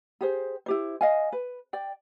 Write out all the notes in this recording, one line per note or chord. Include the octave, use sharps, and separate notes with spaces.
G4 G#4 C5
E4 G4 C5
D#5 F5 G#5
B4
D5 G5